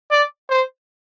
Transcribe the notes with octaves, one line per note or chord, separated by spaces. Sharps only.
D5
C5